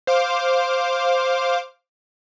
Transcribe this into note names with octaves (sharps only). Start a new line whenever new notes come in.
C5 F5 D6